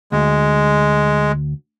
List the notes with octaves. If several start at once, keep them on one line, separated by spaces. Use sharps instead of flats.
D2 G#3